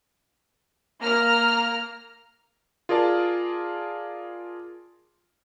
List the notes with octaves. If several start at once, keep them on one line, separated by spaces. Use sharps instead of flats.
A#3 A#5 F6
F4 G#4 A#4 D5 A5